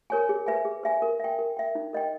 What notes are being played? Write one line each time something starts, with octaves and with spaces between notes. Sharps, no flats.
A#4 C#5 G#5
G#4
B4 E5 G#5
G#4
B4 E5 G#5
A#4
E5 G5
A#4
E5 G5
D#4
A#4 D#5 G5